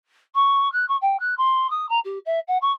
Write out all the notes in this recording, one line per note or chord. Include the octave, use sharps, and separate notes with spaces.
C#6
F#6
C#6
G5
F#6
C6
D#6
A#5
G4
E5
F#5
C#6